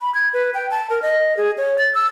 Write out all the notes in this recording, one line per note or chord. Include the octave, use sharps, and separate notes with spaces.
B5
G#6
B4
G5
A5
A#4
D#5
G#4
C#5
A6
E6